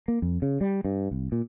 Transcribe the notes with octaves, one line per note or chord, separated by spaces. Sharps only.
A#3
F2
C#3
G3
G2
C2
A#2